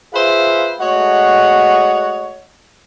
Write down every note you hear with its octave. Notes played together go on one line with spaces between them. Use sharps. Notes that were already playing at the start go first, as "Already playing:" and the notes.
F4 G#4 B4 C5 E5 F5
G#3 A3 F#4 C#5 D#5 F#5